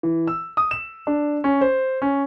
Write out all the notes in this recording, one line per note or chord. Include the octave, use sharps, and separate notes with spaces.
E3
E6
D#6
E7
D4
C#4
C5
C#4